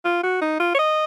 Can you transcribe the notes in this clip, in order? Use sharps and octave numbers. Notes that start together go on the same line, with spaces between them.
F4
F#4
D#4
F4
C#5
D#5